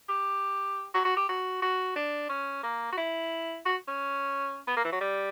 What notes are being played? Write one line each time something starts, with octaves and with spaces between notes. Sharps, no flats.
G4
F#4
F#4
G4
F#4
F#4
D4
C#4
A#3
F#4
E4
F#4
C#4
B3
A#3
E3
F#3
G3